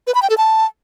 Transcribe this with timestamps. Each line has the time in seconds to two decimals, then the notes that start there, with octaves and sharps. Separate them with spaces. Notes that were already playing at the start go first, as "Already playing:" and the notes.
0.07 B4
0.15 B5
0.22 G5
0.30 A4
0.37 A5